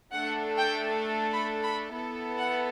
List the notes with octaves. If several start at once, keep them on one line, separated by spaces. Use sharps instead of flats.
A3 D4 A4 F#5
G5
B5
B5
B3 E4 A4
F#5